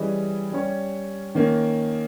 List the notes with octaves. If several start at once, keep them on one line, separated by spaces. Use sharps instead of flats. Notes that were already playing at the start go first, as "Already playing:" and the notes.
Already playing: E3 G3 C#4 G#4 D#5
G3 C#4 G4 C#5
D#3 A#3 C#4